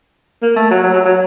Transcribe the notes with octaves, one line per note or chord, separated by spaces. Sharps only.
A#3
A3
F#3
F#3
F#3
F#3